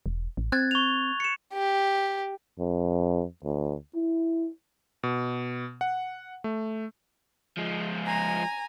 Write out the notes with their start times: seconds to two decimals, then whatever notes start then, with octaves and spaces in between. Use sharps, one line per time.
0.06 E1
0.37 A1
0.52 C4 F#6 G#6 A6
0.71 C#6 F7
1.20 C#7 E7
1.53 G4
2.59 F2
3.44 D2
3.95 E4
5.03 B2
5.81 F#5
6.44 A3
7.57 F3 G#3
8.05 G#5 A#5